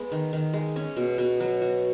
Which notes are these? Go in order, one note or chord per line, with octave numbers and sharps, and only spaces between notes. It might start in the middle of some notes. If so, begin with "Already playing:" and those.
Already playing: G#3 B3
D#3
D#3
G#3
C#4
B2
B2
F#3
F#4